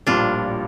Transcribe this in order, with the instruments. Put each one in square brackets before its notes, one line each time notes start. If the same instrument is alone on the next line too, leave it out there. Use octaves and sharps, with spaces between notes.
[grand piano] A#1 A2 G3 A#3 [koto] D4 F4